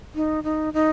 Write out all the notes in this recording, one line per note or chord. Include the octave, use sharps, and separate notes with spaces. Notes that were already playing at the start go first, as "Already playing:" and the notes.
D#4
D#4
D#4